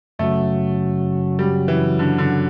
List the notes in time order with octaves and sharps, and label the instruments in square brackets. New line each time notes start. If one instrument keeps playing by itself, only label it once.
[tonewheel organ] F#2 C#3 F#3 [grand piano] A3
[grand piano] G3
E3
D3
D3